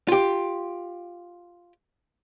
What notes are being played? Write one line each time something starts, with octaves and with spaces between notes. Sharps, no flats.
F4 G4